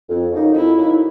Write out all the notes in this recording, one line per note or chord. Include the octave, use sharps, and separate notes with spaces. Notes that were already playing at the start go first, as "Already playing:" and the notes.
F2
C#3 F#3 A#3 D#4
F2 E4
C#3 F#3 A#3 D#4